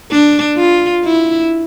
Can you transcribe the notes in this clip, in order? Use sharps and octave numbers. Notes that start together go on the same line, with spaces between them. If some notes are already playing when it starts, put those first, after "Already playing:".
D4
F4
E4